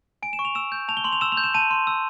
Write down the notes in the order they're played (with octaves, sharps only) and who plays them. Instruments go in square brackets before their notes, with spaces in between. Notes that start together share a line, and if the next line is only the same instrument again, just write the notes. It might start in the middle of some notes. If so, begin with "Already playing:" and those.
[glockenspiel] G#5 D7
E7
C#6
F7
E6 E7
G6
A5 F7
G7
C6 F#7
F7
E6 E7
F7
G6
E7
A5 D#7
C6
E6